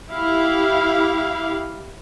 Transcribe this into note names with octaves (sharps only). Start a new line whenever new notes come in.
E4 G4 F5